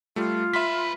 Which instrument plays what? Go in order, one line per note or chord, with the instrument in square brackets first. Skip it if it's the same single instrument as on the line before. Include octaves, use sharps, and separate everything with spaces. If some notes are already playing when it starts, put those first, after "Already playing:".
[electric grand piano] G3 A3 [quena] F4
[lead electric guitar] G#3 B4 [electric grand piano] E5 C6 B6